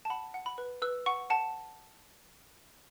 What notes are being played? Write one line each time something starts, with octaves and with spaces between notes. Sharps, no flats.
A5
F#5 B5
F#5
B5
B4
B4 E6
F#5 C#6
F#5 A5